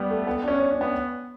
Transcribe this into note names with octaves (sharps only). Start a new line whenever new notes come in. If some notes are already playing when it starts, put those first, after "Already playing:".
Already playing: G3 B3
A3
B3
D4
C#4
D4
C#4
B3